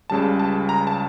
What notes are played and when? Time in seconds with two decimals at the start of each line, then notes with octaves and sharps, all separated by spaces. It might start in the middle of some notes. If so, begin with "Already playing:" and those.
0.10 C#2 C#3 G3 A5
0.39 A5
0.69 A#5
0.87 A5